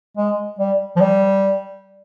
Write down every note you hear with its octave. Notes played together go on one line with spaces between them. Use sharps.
G#3
G3
F3
G3